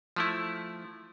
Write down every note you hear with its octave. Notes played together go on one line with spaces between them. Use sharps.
F3 A3 E4